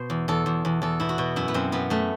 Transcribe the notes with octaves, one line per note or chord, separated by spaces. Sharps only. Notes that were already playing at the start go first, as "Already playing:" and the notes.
Already playing: B2 C5
E2
E2 A4
E2
E2
E2 A4
B2 E4
F#4
B2
F#2 E4
B3
F#2 C4
F#2 B3
F#2 A3